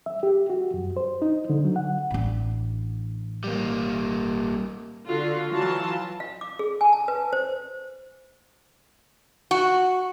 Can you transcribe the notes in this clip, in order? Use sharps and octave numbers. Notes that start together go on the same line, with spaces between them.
E5
G4
F#4
F#2
C5
D#4
D3
F#3
F#5
A1 D4
G3 A#3
D3 F4 F#4
E3 F#3 F4 F#4 A5
F5
D6
G#4
G#5
A5
B4
C5
F#4